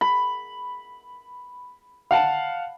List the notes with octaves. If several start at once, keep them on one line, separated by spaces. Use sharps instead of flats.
B5
F5 F#5 A5